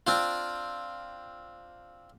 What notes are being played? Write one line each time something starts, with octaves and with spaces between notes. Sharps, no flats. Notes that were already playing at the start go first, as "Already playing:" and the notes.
C4 D4 F4